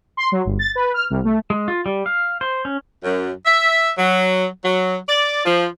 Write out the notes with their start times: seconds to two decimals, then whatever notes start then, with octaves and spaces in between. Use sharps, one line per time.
0.17 C6
0.32 F#3
0.45 G1
0.59 A6
0.75 B4
0.94 F6
1.10 C2
1.24 A3
1.50 G#3
1.68 F4
1.86 G3
2.06 F5
2.41 C5
2.65 C#4
3.04 F#2
3.46 E5
3.99 F#3
4.64 F#3
5.09 D5
5.45 F3